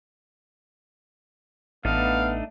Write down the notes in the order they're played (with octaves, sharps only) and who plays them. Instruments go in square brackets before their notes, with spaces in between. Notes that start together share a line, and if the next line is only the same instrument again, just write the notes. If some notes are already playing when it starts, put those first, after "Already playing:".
[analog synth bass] A1 [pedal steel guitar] A3 D4 D#4 [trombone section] B3 [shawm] F5